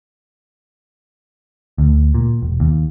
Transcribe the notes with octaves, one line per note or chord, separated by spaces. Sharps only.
D2
A#2
E1
D#2